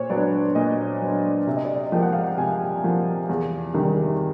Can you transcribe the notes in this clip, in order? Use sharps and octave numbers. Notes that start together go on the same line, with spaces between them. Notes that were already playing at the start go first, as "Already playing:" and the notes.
Already playing: A#2 C5 C#5
F#3 B3 D4 D5
A#2 D#5
F#3 B3 D4
C3 E5
D#5
D5
D#5
F3 A#3 G5
F#5
F5
F#5
C3 G#5
F3 A#3
E2
C3 D#3 G3